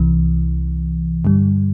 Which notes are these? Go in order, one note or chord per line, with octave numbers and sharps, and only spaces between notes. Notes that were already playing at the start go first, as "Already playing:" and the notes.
Already playing: C2 C3 E3
G2 D3 G3